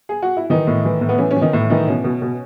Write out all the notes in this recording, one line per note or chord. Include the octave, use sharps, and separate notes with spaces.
G#4
F#4
E4
D#3 E3 D#4
A2
E3
A2
B3
E3 C#4
C#4
E3
D#3 D#4
A2
D#3 E3 D#4
B2 C#4
B2
B2